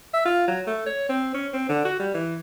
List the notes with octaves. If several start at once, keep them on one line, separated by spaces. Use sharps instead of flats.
E5
F4
F#3
A3
C#5
C4
C#4
C4
D3
F#4
G3
E3